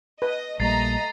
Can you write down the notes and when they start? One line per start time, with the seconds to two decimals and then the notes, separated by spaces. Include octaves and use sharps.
0.22 B4 D#5
0.60 A#1 G3 A3 A#3 D#5 A#5 A6 C7